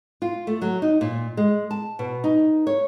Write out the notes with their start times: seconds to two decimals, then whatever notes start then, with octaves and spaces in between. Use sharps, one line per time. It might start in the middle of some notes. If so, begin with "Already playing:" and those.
0.22 F4
0.47 A3
0.62 F#3
0.82 D#4
1.01 A#2
1.37 G#3
1.71 A5
1.99 B2
2.24 D#4
2.67 C#5